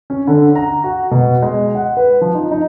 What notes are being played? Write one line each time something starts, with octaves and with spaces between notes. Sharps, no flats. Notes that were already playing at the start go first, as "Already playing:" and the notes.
C#4
D3
A#5
F#4
B2
G#3
F#5
B4
F3
D#4
D#4